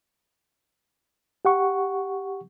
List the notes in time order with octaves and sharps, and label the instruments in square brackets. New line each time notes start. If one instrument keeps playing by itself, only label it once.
[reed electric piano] G4 F#5 C#6